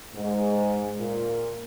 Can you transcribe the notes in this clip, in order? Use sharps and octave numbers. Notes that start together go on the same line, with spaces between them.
G#2
A#2